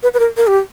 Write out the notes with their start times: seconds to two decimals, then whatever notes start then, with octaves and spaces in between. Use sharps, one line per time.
0.03 B4
0.14 B4
0.19 A#4
0.37 A#4
0.47 G4